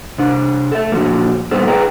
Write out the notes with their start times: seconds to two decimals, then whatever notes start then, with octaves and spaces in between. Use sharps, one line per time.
0.18 C3 D4
0.71 A4 E5
0.92 A#2 D3 F3 F#3 A#3
1.51 A#2 D3 G3 B3 A4 C5
1.67 G#4 B4 D5 D#5 G5 A#5